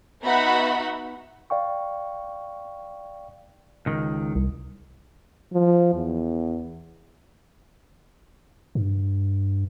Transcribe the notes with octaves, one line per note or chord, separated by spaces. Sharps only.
B3 D#4 F#4 E5 F#5 B5
D5 F5 G5 C#6
C#2 D#3
C2
F3
E2
G2